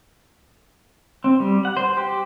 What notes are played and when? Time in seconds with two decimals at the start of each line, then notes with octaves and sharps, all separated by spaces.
1.24 C4
1.40 G3
1.65 F#5
1.77 C5
1.97 G4